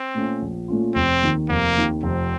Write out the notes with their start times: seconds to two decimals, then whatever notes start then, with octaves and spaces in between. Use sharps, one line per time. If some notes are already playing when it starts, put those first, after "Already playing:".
Already playing: C4
0.15 A#2 A3 C#4 F4
0.42 A#1
0.68 A#2 A3 C#4 F4
0.95 F1 C4
1.22 D#2 D#3
1.49 F1 A#3
1.77 D#2 D#3
2.03 F1 C4